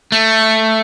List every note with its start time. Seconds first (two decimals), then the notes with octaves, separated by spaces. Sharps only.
0.12 A3